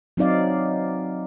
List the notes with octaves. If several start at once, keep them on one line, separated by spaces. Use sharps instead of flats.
F#3 C4 D#4 D5 F5